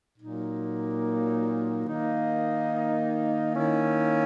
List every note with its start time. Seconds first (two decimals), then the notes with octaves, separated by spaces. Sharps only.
0.19 A#2 F#3 A#3 D#4
1.86 D#3 A#3 D#4
3.53 D#3 A#3 C#4 E4